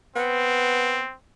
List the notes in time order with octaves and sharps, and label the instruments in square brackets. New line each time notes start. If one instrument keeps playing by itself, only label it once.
[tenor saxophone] B3 [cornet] C4